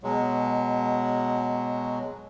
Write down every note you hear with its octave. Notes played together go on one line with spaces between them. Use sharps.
B2 F#3 G#3